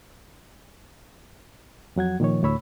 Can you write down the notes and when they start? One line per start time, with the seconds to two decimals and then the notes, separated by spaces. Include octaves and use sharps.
1.96 F2 F#3 F#5 G#6
2.20 A#2 D#3 F3 C#5
2.43 D2 A2 C#5 B5 E6